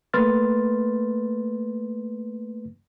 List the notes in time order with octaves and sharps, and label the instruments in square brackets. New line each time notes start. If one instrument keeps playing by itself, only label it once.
[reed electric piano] A3 A#3 B4 C6 F6 A6